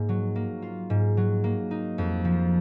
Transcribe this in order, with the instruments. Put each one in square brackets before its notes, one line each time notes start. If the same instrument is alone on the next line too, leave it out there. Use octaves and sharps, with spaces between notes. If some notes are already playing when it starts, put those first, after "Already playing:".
Already playing: [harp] G#2 A#3
F#3
A#3
F4
G#2
F#3
A#3
D#4
F2
F3